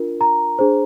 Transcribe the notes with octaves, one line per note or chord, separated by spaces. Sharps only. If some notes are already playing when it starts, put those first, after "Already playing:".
Already playing: D4 F4 A#4
A#5
D4 G#4 C5